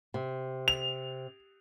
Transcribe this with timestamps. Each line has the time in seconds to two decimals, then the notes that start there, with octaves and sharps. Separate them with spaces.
0.14 C3
0.68 F7